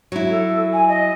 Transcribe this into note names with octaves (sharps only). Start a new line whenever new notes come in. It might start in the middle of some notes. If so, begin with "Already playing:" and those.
F#3 E4
A4
G#5
D#5